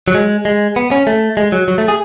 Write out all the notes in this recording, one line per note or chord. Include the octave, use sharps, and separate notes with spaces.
F#3
G#3
G#3
B3
C#4
A3
G#3
F#3
F#3
A3
G#4